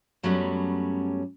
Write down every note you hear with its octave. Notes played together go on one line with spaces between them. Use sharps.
F#2 F#3 G3 A3 B3 C#4